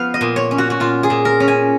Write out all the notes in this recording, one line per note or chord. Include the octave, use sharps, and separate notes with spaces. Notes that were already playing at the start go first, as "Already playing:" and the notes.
Already playing: F3 B3 F5
D#5
A#2
C#5
C#4
F#4
F#4
A#2 F4
G#4
A#2
A#4
C#4
G#5